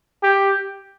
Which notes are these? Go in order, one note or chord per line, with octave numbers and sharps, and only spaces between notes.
G4